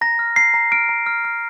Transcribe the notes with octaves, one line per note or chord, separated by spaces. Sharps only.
A#5 A#6
F6
A#5 C7
A#5
F6 D7
A#5
F6
F6